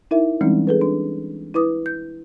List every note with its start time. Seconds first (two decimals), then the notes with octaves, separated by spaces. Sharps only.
0.11 D#4 E4 A#4 E5
0.41 E3 G3 G#3 C4 C#4 D#4
0.67 G#4 A4 B4
0.81 D4
1.54 E4 B4 D6 D#6
1.86 G6